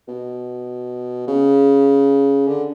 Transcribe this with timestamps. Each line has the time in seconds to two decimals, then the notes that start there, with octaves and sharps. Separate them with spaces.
0.08 B2
1.28 C#3
2.48 D3